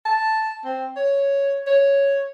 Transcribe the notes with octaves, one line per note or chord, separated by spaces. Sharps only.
A5
C4
C#5
C#5